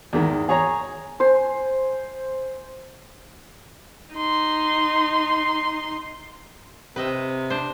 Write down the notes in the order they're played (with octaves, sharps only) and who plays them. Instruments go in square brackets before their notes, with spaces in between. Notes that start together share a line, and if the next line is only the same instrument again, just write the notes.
[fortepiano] E2 G#2 D#3
G#4 C#5 A#5
[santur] C5 G#5
[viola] D#4 C6
[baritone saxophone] C3 [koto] B4 D#5 E5
[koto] D4 C5